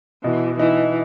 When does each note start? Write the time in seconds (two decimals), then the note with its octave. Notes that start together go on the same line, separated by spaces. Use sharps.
0.24 B2 E3
0.59 E3 D#4